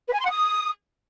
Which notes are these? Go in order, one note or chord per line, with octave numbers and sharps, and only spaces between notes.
B4
G#5
C6
F#5
D#6